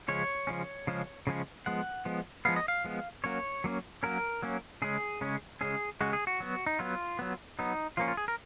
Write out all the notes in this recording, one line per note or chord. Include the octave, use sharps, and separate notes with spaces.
C#3 F3 G#3 C#4 C#5
C#3 F3 G#3 C#4
C#3 F3 G#3 C#4
C#3 F3 G#3 C#4
F3 G#3 B3 F#5
F3 G#3 B3
F3 G#3 B3 F5
D#5
F5
F3 G#3 B3
F#3 A#3 C#4 C#5
F#3 A#3 C#4
F#3 A#3 C#4 A#4
F#3 A#3 C#4
C#3 G#3 C#4 G#4
C#3 G#3 C#4
C#3 G#3 C#4 G#4
C#3 G#3 C#4 F#4
G#4
F#4
F#3 B3
D#4
F#3 B3 F4
F#3 B3
F#3 B3 D#4
F3 A#3 C#4 F4
F4
G#4
A#4